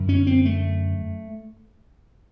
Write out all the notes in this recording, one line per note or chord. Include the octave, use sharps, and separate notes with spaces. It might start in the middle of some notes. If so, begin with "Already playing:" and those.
Already playing: F#2 D3
C#4
C4
A3